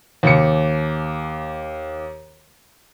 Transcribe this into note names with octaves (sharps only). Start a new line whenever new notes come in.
D#2 C#7